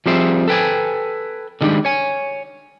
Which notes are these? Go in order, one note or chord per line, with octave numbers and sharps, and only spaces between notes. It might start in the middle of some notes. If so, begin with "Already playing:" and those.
F3 G3 C4 G#4 C5 E5
A4 B4 G5 G#5
D3 D#3 G3 G#3 D4
C#5 G#5